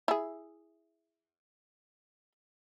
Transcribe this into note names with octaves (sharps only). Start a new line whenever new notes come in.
E4 G#4